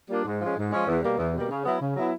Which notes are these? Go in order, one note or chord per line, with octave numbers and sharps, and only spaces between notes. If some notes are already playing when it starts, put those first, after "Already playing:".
G3 A#3 D4 F4
G#2
F3 G#3 C#4
G#2
F3 G#3 C#4
E2
B2 G3 A#3
E2
B2 G3 A#3
C#3
F#3 B3 E4
C#3
F#3 B3 E4